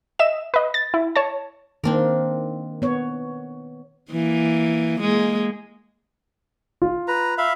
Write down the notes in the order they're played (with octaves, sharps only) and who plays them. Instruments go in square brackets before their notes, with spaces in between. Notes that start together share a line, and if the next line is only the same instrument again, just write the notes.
[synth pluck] D#5 E5 E7
B4 D#5
A6
E4
C#5 A5
[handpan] D#3 A#3 [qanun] C4 D4 A#4
[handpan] B3 C#5
[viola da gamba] E3 A#3
G#3 A#3
[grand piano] F4
[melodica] B4 A#5
E5 F5 B5